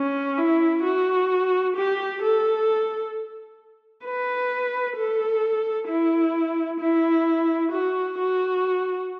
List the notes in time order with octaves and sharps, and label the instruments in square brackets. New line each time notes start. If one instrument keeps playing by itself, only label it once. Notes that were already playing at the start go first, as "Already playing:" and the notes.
Already playing: [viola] C#4
E4
F#4
G4
A4
B4
A4
E4
E4
F#4
F#4